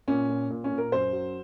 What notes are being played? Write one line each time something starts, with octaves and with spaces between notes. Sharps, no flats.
A#2 C#4
A#2
A#2
C#4
A#2
A#4
F#2 C5
F#3